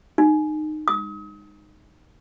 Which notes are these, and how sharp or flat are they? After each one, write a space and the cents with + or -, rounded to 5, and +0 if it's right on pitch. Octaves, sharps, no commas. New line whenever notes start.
D#4 -20
D#6 +40